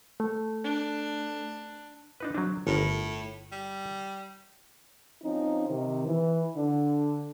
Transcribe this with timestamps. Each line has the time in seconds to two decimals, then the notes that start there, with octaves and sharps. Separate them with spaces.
0.20 A3
0.64 D4
2.20 D4 D#4 B4
2.34 F#3 C4 D4
2.67 G1 A2 A#4
3.52 G3
5.22 F3 C4 C#4 D#4
5.68 C3 D#3
6.07 E3
6.55 D3 D4